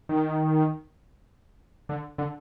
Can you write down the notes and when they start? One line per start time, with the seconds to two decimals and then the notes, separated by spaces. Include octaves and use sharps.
0.09 D#3
1.89 D3
2.18 D3